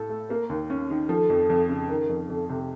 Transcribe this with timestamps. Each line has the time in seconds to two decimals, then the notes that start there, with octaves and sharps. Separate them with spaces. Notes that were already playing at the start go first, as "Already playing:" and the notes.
Already playing: A2 A4
0.09 A3
0.30 A#3 A#4
0.50 D#2
0.70 C#4
0.90 D#3
1.09 F3 A4
1.30 F2
1.50 F2
1.69 C#3
1.89 D#3 A#4
2.09 F2
2.29 F2 A4
2.49 C3